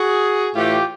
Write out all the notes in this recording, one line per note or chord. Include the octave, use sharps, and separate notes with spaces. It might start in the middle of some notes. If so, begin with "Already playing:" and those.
Already playing: F#4 G#4
A2 E3 A3 F4 G4